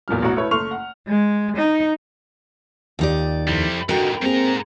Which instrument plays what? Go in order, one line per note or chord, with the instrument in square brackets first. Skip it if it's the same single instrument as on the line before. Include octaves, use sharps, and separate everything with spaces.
[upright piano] E2 A#2 F#3 F6
A1 B2 F#4 A#5
A3 E4 A4 B4 C#5
F#1 A3 C6 C#6 F6 F7
F#5
[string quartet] G#3
D#4
[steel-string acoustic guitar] D#2 D#4 D5 [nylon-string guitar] F4 G4
[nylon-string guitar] F2 E4 [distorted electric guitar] C3 G3
[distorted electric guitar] F2 G#2 [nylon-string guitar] D3 [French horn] F#4 [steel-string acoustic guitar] A#4 G5
[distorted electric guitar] G#2 A#5 [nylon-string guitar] A#3 G#4 [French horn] C4